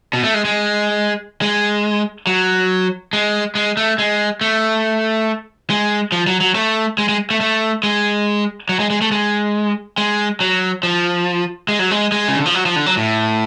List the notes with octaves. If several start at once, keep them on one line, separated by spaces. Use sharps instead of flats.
B2
A3
G#3
G#3
G#3
F#3
G#3
G#3
A3
G#3
A3
G#3
F3
F#3
F#3
A3
G#3
G#3
A3
A3
G#3
F#3
G#3
G#3
A3
G#3
G#3
F#3
F3
G#3
F#3
G#3
G#3
C#3
D3
F3
F#3
F3
D3
F#3
A2